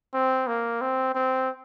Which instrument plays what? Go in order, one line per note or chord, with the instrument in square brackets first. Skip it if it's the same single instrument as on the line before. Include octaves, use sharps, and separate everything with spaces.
[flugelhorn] C4
A#3
C4
C4